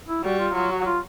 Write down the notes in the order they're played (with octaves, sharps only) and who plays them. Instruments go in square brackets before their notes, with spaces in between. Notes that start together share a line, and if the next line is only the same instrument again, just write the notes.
[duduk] E4
[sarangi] G3 [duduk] F#4
[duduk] F4
[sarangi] F#3 [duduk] F4
[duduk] F#4
F4